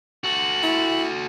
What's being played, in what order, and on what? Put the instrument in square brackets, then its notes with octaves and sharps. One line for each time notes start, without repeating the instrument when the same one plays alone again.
[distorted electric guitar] F#4 A4 [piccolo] F#7
[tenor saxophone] E4